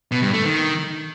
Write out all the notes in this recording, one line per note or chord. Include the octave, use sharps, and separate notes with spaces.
B2
G2
A3
D#3